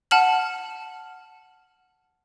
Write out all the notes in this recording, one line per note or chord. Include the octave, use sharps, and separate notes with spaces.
F#5 A5 F6 F#7